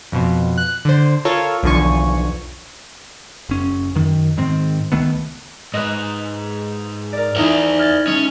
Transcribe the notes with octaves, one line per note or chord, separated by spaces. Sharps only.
F2 B2
F#6
D3 C5
F4 A4 A#4 C#5
B1 E2 D3 F3 G#5 C#6
F#1 C#4
F#2 D#3
G#2 D#3 C4
C#2 D#3 A3 B3
G#2 B4 D#5
A#4 D5
E2 D#4 E4 D5 E5
F6 G#6 A6
G#3 A3 C#4